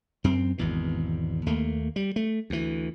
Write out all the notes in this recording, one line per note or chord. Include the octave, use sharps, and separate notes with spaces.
F#2 C4
G#1 E2 B2
D#2 A3 A#3
G3
A3
D2 E3